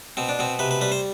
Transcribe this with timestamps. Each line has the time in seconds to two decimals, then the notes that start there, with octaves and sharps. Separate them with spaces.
0.17 B2 C4
0.29 D4
0.39 B2 C4
0.59 C3 B4
0.71 B4
0.81 G3 B4
0.92 C5